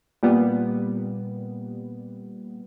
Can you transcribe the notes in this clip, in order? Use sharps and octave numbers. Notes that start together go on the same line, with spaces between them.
A#2 G3 B3